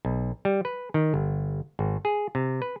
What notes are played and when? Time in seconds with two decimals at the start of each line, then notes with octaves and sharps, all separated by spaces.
0.05 B1
0.45 G3
0.65 B4
0.94 D#3
1.14 G1
1.79 G#1
2.05 G#4
2.35 C3
2.62 B4